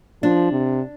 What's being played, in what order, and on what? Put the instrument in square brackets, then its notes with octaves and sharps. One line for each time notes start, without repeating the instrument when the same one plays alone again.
[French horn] F3 [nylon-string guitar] D4
[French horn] C3